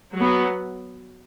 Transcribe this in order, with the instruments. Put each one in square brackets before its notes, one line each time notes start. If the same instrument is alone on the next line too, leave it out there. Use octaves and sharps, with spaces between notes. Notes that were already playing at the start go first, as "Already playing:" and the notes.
[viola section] F#3 B3